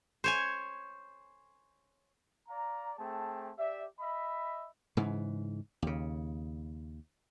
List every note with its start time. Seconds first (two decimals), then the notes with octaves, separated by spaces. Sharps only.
0.24 C5 C#5 G#5
2.48 D5 F5 A#5
2.98 A3 C4 G#4 G5 A5
3.57 G4 D5 E5
4.00 D#5 E5 B5
4.97 G#2 C#3 E3
5.82 D#2 C#3